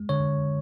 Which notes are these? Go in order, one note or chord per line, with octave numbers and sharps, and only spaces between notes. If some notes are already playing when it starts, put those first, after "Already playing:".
Already playing: G#3
D3 C#5